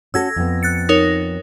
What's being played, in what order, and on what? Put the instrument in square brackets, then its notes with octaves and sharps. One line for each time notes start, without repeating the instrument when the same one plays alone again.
[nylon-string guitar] C#4 F#4 A4 [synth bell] E6 G#6 A#6
[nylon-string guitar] F2 B3
[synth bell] F#6 A6 C#7
D#4 A#4 C#5